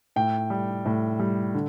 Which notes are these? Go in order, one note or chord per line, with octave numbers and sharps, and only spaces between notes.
A2 G5
G3
A2
G3
D3